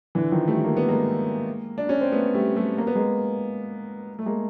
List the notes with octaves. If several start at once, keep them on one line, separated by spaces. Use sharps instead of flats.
D3 E3
D#3 F3
G3 A3
A#3
B3
G#3 A#3
D4
C#4
C4
A3 B3
G3 A3
G3 A3
A#3
B3
G#3 A#3
A3
G#3 A#3